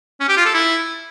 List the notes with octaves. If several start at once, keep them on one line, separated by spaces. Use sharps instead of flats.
C#4
G4
F4
A4
E4